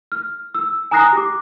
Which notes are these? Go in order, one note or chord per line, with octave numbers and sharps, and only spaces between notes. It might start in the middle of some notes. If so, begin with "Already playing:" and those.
F6
E6
G#5 A#5 D#6 F#6 A#6 C7
G4 D6